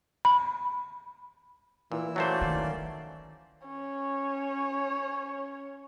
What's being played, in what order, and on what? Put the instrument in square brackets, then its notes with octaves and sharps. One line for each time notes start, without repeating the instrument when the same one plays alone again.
[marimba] B5
[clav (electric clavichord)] A#2 [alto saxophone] E3 [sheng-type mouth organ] E4 E6
[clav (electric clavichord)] F#3 A3 C5 [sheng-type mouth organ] A#3 C#4 D5
[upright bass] D#3
[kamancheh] C#4 C#5